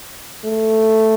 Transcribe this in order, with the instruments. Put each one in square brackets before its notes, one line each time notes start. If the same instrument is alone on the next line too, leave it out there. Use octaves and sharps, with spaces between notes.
[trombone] A3